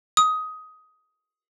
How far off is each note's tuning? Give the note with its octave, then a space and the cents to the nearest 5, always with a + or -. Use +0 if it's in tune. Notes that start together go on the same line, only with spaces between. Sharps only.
D#6 +15